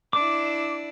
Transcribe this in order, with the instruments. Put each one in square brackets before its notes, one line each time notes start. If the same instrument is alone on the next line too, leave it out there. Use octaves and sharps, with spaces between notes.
[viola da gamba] D4 E4 [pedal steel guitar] D6